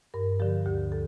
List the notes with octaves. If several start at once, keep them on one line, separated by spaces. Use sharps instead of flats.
G2 A#4
D3 F3 G4
D2 G4
A4